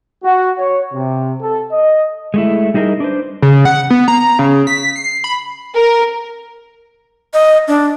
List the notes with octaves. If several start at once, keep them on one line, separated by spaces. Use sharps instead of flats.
F#4
C#5
C3
A4
D#5
G#3 A3 E4
G3 D#4 E4 G#4 A#4 D#5
D4 B4 C5
C#3
F#5
B3
A#5
C#3
B6
C7
B5
A#4
D#5
D4